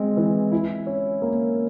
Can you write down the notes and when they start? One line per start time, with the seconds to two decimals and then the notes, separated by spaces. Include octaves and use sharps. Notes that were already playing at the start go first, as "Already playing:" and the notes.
Already playing: G#3 C4
0.17 E3
0.52 E4
0.86 C#4
1.22 A#3